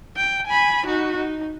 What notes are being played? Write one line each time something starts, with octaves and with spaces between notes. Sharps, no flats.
G5
G#5 B5
D#4 F#4
D#4